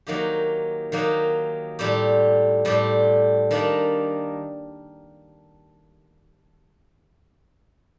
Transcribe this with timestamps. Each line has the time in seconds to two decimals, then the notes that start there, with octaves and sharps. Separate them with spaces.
0.07 D#3 F#3 A#3 D#4 G4
0.92 D#3 F#3 A#3 D#4 G4
1.79 A2 G3 C4 G4
2.65 A2 G3 C4 G4
3.51 D#3 G3 A#3 D4